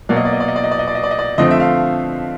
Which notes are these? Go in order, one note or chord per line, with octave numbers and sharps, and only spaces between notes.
B2 F#3 A#3 D5
D#5
D5
D#5
D5
D#5
D5
D#5
D5
D#5
D5
D#5
D5
D#5
D5
D3 F3 A3 C4 D#5
E5
F5